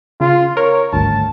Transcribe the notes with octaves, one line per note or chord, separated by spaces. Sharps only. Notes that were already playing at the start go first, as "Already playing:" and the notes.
C#3 F4
A#4 C#5
G#1 D2 G2 A5